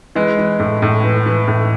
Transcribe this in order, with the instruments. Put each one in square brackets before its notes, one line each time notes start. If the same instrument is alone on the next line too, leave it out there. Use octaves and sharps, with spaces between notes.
[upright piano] E3 G#3
E3
A2
A2
E3
E3
A2